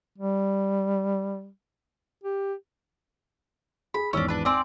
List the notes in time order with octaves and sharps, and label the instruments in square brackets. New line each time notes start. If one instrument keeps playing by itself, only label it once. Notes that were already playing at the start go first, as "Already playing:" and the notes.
[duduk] G3
G4
[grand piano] G#4 [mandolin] B5
[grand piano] G#1 E2 E6 [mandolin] C#4 D4
[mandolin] D4 B4
[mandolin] C4 D5 [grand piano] G#5